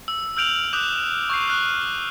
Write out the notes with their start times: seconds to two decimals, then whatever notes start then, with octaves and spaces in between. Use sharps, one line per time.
0.08 E6
0.36 E6 F6 G6 D7 F7 F#7
0.73 D6 D#6 F#6 G6 E7 F7
1.30 C#6 G6 C7
1.47 F6 F#6